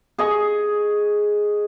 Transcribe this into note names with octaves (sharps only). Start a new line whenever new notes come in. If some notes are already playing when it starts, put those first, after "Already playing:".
G#4 D#5 C#6